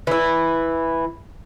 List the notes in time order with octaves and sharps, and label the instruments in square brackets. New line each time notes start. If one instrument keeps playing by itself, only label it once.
[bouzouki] E3 E4